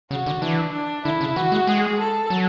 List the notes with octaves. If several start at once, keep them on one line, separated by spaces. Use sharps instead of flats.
C#3 F#4
D3
E3 D4
D4
D3 E4
C#3
E3 F#4
G#3
G#3 G#4
A4
F#3